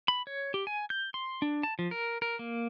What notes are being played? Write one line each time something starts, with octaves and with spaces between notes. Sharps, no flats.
B5
C#5
G4
G#5
G6
C6
D4
A5
F3
A#4
A#4
A#3